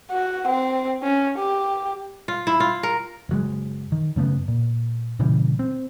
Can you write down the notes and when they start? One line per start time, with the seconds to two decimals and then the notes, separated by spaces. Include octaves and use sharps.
0.11 F#4
0.48 C4
1.03 C#4
1.38 G4
2.28 F4
2.47 E4
2.60 F4
2.83 A#4
3.29 F#1 F#3 G#3
3.92 D#3
4.16 F#2 C#3 A3 B3
4.48 A#2
5.19 A#2 C#3 E3 G3
5.59 C4